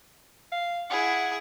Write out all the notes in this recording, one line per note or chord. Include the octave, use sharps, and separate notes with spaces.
F5
E4 G#4 F#5